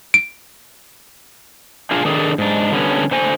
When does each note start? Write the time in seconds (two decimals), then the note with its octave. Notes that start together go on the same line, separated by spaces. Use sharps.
0.14 D7
1.91 D4 F4 G#4
2.05 D#3 D4 G#4 A4
2.38 G#2 D4
2.72 D3 G3 B3 C#4
3.11 D3 C5 G#5